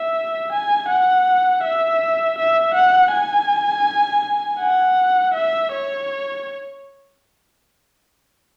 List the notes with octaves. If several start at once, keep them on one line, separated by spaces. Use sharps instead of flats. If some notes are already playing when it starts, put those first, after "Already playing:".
Already playing: E5
G#5
F#5
E5
E5
F#5
G#5
F#5
E5
C#5